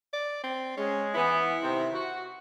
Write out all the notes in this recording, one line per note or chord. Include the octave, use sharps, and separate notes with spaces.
D5
C4
G#3 C#4
E3 B3 E4
C3 D#3 C4
F#4